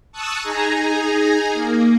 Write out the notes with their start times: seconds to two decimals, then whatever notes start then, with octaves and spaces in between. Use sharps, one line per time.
0.12 A5 C#6 D#6 E6 F#6
0.42 D#4 G#4 G#5 A#5
1.53 A#3